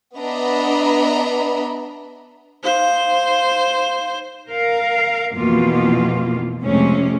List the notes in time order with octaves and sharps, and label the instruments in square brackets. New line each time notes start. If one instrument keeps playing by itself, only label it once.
[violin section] B3 D4 D#5 E5 A#5 B5
[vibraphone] D#4 F5 [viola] C5
[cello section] A#4 F5
F2 B2 E3 A#3 F4
F2 C3 G#3 A3 C#4